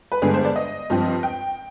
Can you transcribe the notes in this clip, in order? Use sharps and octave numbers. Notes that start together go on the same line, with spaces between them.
B4
G2 D3 G#3 B3 G#4
C5
D5
D#5
G2 F3 C4
G5